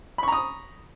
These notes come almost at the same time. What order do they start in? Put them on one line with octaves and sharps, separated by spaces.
B5 C#6 A#5 D#6